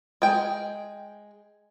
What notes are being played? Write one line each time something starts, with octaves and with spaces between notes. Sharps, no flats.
G#3 G5